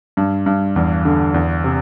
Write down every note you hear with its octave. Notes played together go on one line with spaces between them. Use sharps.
G2
G2
E2
D3
E2
C3